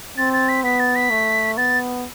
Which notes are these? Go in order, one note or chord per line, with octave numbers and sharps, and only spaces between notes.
C4 A6
A6
B6
B3 B6
A6
B6
A3
B3 A6